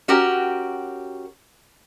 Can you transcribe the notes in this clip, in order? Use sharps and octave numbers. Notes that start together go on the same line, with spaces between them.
C#4 F#4 G4 A#4